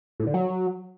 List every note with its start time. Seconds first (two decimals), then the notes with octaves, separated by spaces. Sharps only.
0.20 A2
0.27 D3
0.34 F#3